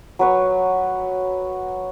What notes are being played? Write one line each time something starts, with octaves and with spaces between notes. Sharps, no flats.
F#3 B4 C#5